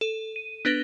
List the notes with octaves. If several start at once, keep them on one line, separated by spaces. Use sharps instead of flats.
A4
D#7
B3 D4 B4 A#6 G7